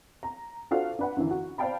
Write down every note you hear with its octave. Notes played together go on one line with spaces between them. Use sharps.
A#5
D4 F4 F#4 A4 C5 F5
D4 B4 F#5
F#2 D3 E3
F#4
C5 D5 F5 G5 A5 B5